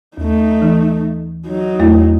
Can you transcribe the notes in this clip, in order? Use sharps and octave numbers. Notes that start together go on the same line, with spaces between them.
D#2 A3 D#4
E3
F#3 D#4
E2 A3 E4